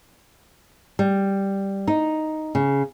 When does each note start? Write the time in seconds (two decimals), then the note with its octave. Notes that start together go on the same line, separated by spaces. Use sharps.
0.99 G3
1.87 D#4
2.55 C#3